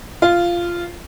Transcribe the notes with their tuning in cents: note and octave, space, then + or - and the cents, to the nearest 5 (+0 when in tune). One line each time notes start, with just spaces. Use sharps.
F4 -10